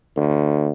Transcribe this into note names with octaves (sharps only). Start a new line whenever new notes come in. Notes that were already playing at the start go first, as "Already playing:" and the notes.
D2